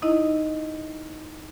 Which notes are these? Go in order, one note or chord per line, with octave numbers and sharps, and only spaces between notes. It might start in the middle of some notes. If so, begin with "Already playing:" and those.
D#4 E4 D#5